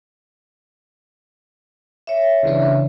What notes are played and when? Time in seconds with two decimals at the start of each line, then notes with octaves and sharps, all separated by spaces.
2.07 C#5 E5
2.43 C#3 E3 D4